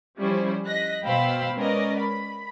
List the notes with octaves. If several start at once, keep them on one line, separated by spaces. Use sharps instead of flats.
F3 G3 C#4 E4 C5
D#5 F#6 A#6 B6
B2 C5 F5 G5 B5 E6
G#3 C#4 A#4 B4 D5 D#5
B5